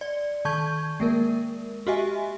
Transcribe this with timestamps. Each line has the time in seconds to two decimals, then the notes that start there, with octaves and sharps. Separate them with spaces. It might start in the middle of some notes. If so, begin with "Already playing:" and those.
0.01 D5
0.45 D#3 A5 C#6 G6 G#6
1.00 G#3 A#3 A#4
1.87 F#4 G4 D#5 E5 G#5